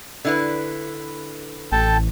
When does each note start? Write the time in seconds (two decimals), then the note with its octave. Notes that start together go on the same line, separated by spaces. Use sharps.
0.25 D3 E4 B4
1.72 A1 A4 G5 A5